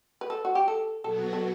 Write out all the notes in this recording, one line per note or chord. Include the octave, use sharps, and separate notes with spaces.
B4
A4
F#4
G4
A4
B2 F#3 B3 F#4 A4
A4